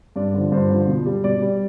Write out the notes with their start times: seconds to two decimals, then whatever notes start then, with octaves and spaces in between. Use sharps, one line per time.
0.16 G2 D5
0.34 D3 F3
0.52 G2 C5
0.70 D3 F3
0.88 B2
1.05 G3
1.24 B2 D5
1.41 G3